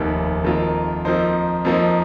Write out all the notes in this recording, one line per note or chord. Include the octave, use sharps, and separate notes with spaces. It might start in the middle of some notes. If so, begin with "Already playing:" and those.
Already playing: F1 D#2 D#3
F2 D#3 A#3 F4
F2 F3 A#3 D#4 C5
F2 F3 A#3 D#4